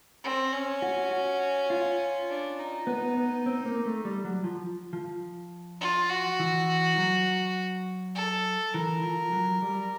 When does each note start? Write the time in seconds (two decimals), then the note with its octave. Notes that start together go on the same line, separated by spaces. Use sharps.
0.24 C4
0.52 C#4
0.82 F#4
1.11 F#4
1.70 F4
2.29 D4
2.58 D#4
2.87 B3
3.17 B3
3.46 C4
3.66 A#3
3.85 A3
4.05 G3
4.25 F#3
4.44 F3
4.93 F3
5.81 F4
6.09 F#4
6.40 E3
6.98 F#3
8.15 A4
8.73 E3 A#4
9.03 F3
9.33 F#3
9.62 G3